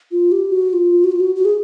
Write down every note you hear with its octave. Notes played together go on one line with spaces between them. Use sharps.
F4
G4
F#4
F4
F#4
F4
F#4
F#4
G#4